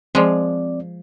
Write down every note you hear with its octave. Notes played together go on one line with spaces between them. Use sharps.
F3 G#3 C4 D5